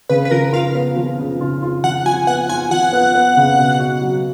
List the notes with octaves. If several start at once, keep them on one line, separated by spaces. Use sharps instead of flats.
C#3 B4
B4
F3 A#4
F4 F5
B3
F3
C#3
F4
F4
F3 F#5
F3 G#5
B3 F#5
F4 G#5
F3 F#5
B3
B3
C#3
B2
F#4
F#3